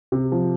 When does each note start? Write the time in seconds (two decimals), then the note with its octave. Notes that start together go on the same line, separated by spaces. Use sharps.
0.12 C3
0.32 F3